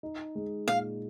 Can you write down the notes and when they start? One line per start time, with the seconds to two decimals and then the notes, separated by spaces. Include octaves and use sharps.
0.03 D#4
0.35 G#3
0.67 A#2 F5